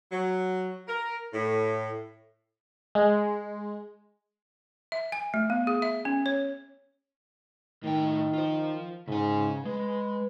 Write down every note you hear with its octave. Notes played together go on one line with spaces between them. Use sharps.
F#3
A#4
A2
G#3
E5
G#5
A3
B3
G#4
E5
C#4
C#5
A2 D#3 G5
F4 C5
G#2 C#3 G#5
G#3 B4